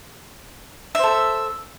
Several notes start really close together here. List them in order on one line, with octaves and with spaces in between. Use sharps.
E5 C5 A4